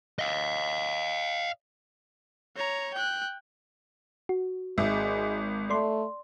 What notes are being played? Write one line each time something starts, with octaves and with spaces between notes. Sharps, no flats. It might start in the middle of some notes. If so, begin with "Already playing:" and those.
D#5 F5
C#5 A#5
G5 F#6
F#4
G#1 G#3 E5
A3 D5 C6